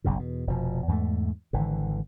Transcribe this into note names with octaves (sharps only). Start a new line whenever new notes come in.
F#1 B1 G2 C#3
E2 B2
F1 B2 F3
E2 G#2 G3 A3
G#1 D3 E3